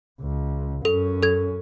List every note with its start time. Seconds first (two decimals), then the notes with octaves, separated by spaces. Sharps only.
0.21 C#2
0.85 F#2 C#4 A4
1.23 A4 G#6